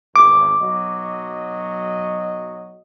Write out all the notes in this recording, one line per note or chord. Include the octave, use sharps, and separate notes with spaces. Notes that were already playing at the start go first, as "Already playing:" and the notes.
G#1 E2 D6
B1 F#3 D#5